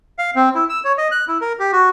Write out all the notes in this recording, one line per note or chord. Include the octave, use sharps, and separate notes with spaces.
F5
C4
E4
E6
C#5
D#5
F#6
E4
A#4
G4
F#4